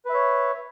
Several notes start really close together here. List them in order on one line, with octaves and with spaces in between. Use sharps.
B4 E5 C#5